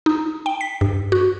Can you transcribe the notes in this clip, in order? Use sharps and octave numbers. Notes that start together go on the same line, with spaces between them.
D#4
G5
B6
G2
F#4